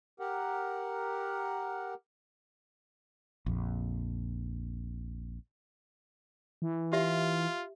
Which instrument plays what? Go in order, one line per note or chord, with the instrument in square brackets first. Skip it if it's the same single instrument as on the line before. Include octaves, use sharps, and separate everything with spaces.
[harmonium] G4 A#4 F#5
[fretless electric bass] A#1 F2
[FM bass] E3
[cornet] F4 [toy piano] G4 E5